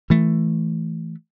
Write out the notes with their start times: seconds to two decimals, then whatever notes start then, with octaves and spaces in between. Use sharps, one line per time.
0.10 E3 A3